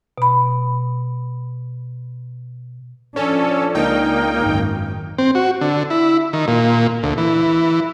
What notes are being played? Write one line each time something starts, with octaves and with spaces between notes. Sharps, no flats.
B2 B5
F3 C#4 D4 A4
C#2 A#3 D#4 G5
G#1 F#2
C4
F#4
D3
E4
D#3
A#2
D2
E3